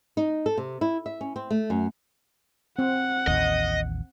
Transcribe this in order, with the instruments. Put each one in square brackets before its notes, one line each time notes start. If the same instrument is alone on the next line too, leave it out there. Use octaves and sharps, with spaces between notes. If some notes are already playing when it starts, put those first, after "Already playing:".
[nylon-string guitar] D#4
A4
C3
E4
E5
C#4
C4
A3
F#2
[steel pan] C4 [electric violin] F#5
[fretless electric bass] A1 D#2 [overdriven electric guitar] D#5